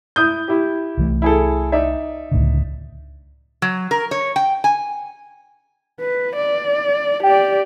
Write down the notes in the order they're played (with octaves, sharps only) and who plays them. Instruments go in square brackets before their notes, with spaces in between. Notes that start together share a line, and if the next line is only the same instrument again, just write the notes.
[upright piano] E4 D#6 G6
E4 G4
[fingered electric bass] C2 E3 A3
[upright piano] E4 G#4 A4
D#4 D5 E5
[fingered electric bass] C#2 A2 D3
[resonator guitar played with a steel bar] F#3
A#4
C#5
G5
G#5
[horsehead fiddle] B4
D5
[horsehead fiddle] G4 D5 [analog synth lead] G5